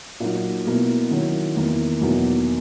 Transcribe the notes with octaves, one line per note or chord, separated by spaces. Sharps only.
A#2 F#3 A#3 D#4
B2 A#3 E4
D#3 F#3 C#4 E4
E2 D#3 A#3 E4
E2 B2 F#3 A#3 D#4